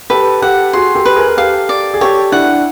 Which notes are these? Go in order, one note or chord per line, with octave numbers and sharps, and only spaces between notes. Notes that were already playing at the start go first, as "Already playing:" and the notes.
G4 A4 B4
G4 A4 F#5
F#4 G#4 C6
G4 A4
B4
G#4 A#4
G#4
G4 A4 F5
D5
G#4
G4 A4 C#5
D4 E4 F#5